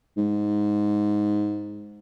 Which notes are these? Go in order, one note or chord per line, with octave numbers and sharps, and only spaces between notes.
G#2